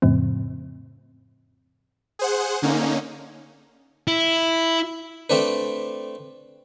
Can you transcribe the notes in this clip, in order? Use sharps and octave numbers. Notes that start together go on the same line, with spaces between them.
F2 A2 C#3 F3 C4
G#4 C5 F#5
D3 A#3 C#4 D#4
E4
A3 C4 D4 B4